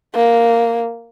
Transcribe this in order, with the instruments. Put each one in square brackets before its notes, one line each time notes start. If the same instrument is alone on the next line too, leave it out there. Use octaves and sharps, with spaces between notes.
[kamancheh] A#3